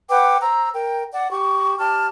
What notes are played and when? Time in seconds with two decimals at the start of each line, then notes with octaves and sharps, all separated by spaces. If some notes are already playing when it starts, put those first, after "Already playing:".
0.09 B4 F#5 G5 D6
0.41 C5 A#5 E6
0.73 A#4 G5
1.12 D5 F#5
1.30 G4 C#6
1.78 G4 D5 A5 F6